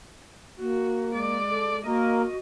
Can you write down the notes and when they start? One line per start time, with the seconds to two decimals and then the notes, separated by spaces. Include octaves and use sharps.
0.59 A#3 F#4
1.11 G#3 D5
1.50 A4
1.85 A#3 F#4 A#4 D#5